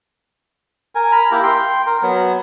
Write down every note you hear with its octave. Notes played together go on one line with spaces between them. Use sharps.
A#4 G#5
A#5 B5
A#3 E4 G4 A#4
G5 C6
A#4
F#3 B3